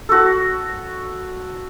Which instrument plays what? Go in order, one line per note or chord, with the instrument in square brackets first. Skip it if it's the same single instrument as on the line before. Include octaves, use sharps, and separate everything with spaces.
[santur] F#4 A4